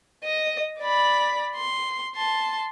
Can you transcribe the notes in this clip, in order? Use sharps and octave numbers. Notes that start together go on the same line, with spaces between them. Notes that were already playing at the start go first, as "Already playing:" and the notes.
D#5
D5 B5
C6
A5 C6